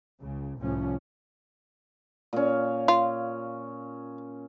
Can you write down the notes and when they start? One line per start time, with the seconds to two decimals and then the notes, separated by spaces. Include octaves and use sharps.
0.21 C#2 C#3
0.58 C2 A2 F3 C#4
2.33 A#2 C#4
2.88 F4